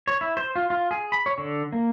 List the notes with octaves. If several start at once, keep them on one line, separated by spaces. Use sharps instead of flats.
C#5
E4
C5
F4
F4
G#4
B5
C#5
D3
A#3